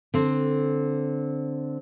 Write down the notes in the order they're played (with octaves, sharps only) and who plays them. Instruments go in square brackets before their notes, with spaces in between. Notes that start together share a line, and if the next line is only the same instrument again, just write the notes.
[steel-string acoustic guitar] D3 C4